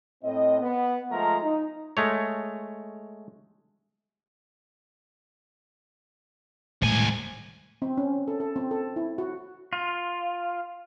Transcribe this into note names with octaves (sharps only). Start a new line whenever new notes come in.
A2 C4 D#5
B3
F3 G#3 A3 A#4 A#5
D#4
G#3 A3 C#5
D#1 C2 A2 G#3 G#5
C4
C#4
A4
A4
C4
A4
E4
F#4
F4